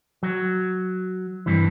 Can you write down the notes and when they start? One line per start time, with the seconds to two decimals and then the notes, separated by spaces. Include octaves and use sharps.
0.23 F#3
1.46 G2 E3